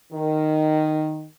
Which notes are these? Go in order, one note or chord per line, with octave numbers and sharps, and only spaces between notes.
D#3